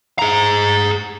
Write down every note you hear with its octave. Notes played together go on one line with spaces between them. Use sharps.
G#4 A#5